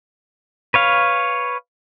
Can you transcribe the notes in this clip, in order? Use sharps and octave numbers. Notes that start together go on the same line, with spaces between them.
B4 C#5 F5